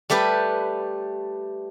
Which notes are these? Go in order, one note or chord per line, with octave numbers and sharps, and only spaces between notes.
G3 A3 G4 B4